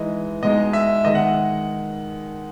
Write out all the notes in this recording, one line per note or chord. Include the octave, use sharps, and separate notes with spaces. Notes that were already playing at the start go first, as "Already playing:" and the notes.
Already playing: E3 G#3 D#4 D#5
B2 G#3 D#4 D#5
E5
D#3 G#3 D#4 D#5
F#5